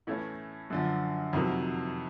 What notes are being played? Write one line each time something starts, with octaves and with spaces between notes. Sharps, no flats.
A2 E3 A3 C#4 E4
F#2 D3 F3
F2 C3 D#3 F#3 A#3